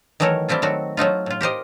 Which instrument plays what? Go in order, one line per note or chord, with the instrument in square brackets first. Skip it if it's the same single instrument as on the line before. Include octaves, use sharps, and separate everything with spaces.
[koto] D#3 E3 F#3 A3 A#4 C#5
G3 A3 C4 E4 F4
D#3 F#3 A3 F#4
F#3 A3 D#4 F4
A2 F4
G4 A#4 C5 D#5